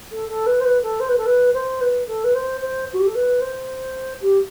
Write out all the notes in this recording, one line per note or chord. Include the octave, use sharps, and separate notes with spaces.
A4
A4
B4
C5
B4
A4
C5
B4
A4
B4
C5
B4
A4
B4
C5
C5
F#4
G4
A4
B4
C5
G4